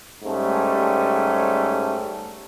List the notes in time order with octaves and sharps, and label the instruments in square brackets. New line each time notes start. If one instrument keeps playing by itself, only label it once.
[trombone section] G#2 G3 A3 C#4